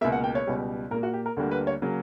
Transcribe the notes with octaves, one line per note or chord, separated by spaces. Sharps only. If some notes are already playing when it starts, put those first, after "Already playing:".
C#2 B2 A#3 E5
F#5
G5
C#5
C#2 B2 G3
A#2 A#3 A#4
F#4
G4
A#4
D2 D3 G3 A#3
B4
C#5
C#3 F#3 A#3